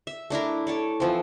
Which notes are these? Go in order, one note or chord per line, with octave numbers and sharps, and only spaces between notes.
E5
A3 D4 E4 A#4
A4 C#5 D5
E3 F3 C4